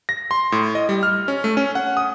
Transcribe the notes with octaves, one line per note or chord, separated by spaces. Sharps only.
A#6
C6
A2
D#5
G3
F6
C#4
A3
C#4
F#5
D#6